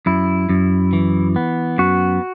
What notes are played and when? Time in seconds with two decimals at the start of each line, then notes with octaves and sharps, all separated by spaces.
0.06 F#2 E4
0.49 F#2
0.93 E3
1.36 B3
1.78 F#2 F#4